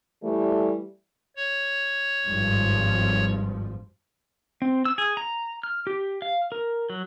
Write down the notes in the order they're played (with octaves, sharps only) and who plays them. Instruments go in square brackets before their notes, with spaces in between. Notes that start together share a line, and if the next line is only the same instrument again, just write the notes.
[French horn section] E3 G3 A3
[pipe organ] C#5
[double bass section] G#1 G2 F3
[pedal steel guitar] C4
E6
G#4
A#5
F6
G4
F5
A#4
F#3